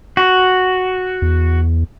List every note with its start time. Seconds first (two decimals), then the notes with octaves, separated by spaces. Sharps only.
0.17 F#4
1.22 E2